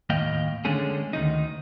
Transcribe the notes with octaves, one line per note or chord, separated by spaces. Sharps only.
D#2 A2 A#3 D#5 F5 G5
D3 G#3 A3 C#4 G#4
D2 D#3 D#4